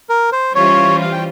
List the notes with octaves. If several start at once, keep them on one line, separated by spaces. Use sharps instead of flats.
A#4
C5
E3 G3 C#4 F4 C5 C#5
F5
G5